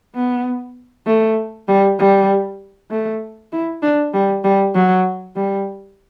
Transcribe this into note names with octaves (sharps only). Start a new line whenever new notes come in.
B3
A3
G3
G3
A3
E4
D4
G3
G3
F#3
G3